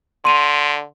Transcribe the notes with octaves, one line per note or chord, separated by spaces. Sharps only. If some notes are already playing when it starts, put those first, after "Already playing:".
D3 C6 D#7 F7